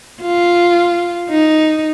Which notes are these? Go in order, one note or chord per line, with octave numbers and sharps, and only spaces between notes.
F4
D#4